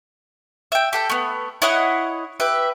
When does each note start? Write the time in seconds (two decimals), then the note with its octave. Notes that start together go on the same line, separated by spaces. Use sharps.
0.72 E5 G5
0.93 G4 A4 G5
1.10 A3 B3
1.62 E4 C#5 D#5 F#5
2.40 G4 B4 E5